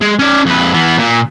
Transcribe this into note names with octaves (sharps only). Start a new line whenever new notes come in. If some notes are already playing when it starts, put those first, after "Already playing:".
G#3
C#4 D5
F2 B4
E3 B3
A#2